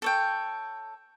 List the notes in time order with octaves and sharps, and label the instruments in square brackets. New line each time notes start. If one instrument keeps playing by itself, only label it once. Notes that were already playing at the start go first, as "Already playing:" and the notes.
[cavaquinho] A4 C#5 G5